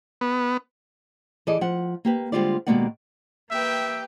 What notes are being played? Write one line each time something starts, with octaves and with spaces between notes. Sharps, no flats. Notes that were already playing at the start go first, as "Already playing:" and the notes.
B3
E3 G#4 A4 D5 D#5
F3 F#5
A#3 G4 B4
D3 G3 G#3 F4 C5 D5
D#2 B2 G#3 A#3 D5 F#5
A#3 G4 B4 E5 G5